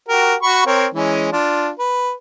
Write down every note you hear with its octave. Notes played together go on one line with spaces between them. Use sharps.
F#4 G4 A#4
F#4 B5 C#6
C4 A#4 C#5
E3 G#3 C#4
D4 F4
B4